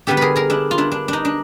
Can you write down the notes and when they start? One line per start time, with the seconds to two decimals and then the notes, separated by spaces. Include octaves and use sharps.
0.07 D3 G3 B3 D4 G4 A4
0.17 G#4 A#4 B4
0.36 G#4 A#4
0.50 D4 E4
0.71 F4
0.78 D4 E4
0.92 D4
1.08 D4 D#4
1.25 D4